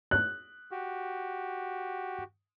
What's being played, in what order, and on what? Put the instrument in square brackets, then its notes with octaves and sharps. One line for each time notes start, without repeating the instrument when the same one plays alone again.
[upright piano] F#6
[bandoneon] F#4 G4